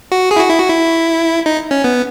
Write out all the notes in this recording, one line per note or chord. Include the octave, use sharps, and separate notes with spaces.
F#4
G#4
E4
F#4
E4
F#4
E4
D#4
C#4
B3